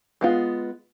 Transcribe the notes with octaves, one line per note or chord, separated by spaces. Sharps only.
G#3 B3 F4